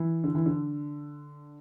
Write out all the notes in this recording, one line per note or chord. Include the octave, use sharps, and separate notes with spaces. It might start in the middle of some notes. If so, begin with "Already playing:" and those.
Already playing: E3
D3
E3
D3